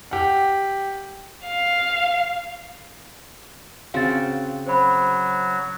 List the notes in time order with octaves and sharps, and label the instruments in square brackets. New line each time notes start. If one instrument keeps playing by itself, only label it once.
[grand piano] G4 F#5
[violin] F5
[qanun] C#3 C4 F#4 [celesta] F5 A6
[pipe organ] F#3 [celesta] C5 B5